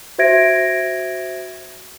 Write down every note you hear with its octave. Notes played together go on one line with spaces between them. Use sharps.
F#4 C5 E5 G#6 A#6 D7